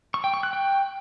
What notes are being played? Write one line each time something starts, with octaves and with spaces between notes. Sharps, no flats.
C#6
G5
C#6
F#6
G5